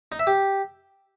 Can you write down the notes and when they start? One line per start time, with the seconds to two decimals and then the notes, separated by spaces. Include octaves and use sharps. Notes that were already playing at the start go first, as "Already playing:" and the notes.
0.12 D#4
0.19 E5
0.27 G4